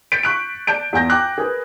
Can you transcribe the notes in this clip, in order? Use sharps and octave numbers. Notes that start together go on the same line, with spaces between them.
G6 A6 B6 C#7 D7
C#6 F#6 D7
D5 A5 G6 D7
E2 G#5 G6 A#6
G5 D6 F#6
G#4 A#4 B4